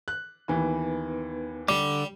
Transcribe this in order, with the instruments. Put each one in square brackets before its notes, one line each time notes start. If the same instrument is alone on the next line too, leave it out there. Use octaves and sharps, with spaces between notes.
[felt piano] F#6
[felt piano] D#2 E3 [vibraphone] B3 D#4 B4
[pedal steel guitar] D3 D6 [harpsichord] G3